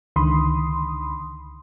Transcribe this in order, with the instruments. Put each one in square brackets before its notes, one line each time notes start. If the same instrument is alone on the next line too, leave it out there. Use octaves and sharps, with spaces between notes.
[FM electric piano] C#2 D3 D#3 B5 C6 D#6